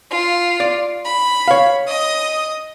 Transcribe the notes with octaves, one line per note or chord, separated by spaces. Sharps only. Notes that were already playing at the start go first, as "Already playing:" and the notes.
F4
D5
B5
C#5 F5
D#5 D#6